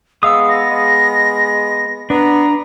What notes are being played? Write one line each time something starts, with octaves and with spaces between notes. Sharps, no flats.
G#3 B3 F5 D#6 E6
A#6
G#3
B3 D4 A#5